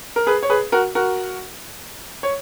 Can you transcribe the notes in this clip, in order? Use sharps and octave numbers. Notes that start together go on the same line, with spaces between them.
A#4
G#4 B4
C#5
G#4 B4
F#4 A#4
F#4 A#4
C#5